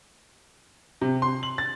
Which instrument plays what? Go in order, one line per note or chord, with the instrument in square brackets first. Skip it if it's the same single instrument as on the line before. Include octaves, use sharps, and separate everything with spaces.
[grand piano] C3
C6
F#7
A6